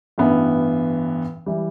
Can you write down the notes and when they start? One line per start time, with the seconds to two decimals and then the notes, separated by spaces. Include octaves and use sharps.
0.18 A1 G2 E3 B3
1.46 E3 G3